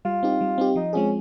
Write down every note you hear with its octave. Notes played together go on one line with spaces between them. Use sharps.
G3 F4
C4 D#4 G4
G3
C4 D#4 G4
F3 D#4
G#3 C4 C#4 F4 G#4